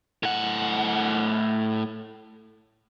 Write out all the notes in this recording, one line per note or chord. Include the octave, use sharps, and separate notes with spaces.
A2 F#5